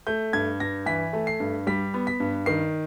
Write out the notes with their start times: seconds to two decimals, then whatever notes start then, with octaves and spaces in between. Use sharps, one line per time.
0.07 A3 G6
0.33 G2 G#6
0.60 G2 A#6
0.86 E3 B6
1.13 A3
1.27 C7
1.40 G2
1.67 G3 B6
1.94 B3
2.07 B6
2.20 G2
2.46 D#3 C7